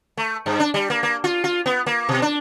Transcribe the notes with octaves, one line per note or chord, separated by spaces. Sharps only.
A3
G2
D4
G3
A#3
A#3
F4
F4
B3
A#3
B2
D4